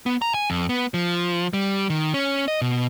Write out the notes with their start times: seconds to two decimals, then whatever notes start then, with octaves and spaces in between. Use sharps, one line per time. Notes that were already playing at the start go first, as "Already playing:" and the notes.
0.06 B3
0.22 A#5
0.34 G#5
0.50 F2
0.69 B3
0.94 F3
1.53 G3
1.90 D#3
2.14 C#4
2.48 D#5
2.61 B2